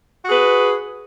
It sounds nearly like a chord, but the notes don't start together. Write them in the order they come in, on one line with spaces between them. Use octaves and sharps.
F#4 G#4 B4